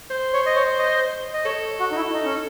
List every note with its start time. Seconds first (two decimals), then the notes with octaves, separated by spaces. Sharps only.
0.11 C5
0.34 C#5
0.46 D#5
0.56 C#5
0.79 D#5
1.34 D#5
1.45 A4 C#5
1.79 F#4
1.91 D#4
1.96 E4
2.14 D#4
2.24 C#4